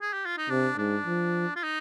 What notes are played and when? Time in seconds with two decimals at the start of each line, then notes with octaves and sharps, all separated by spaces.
0.01 G#4
0.13 G4
0.26 F4
0.38 D#4
0.50 C3 D4
0.78 G#2 D4
1.06 F3
1.56 F4
1.63 D#4